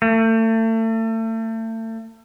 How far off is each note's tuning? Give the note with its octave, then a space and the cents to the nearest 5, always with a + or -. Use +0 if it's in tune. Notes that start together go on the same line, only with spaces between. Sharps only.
A3 +35